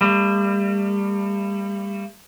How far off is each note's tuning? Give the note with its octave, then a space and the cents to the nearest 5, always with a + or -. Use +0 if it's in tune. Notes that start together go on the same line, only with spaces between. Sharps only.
G3 +30 A#3 -45